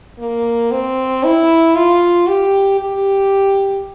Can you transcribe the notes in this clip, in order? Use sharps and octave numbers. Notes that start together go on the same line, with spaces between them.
A#3
C4
E4
F4
G4
G4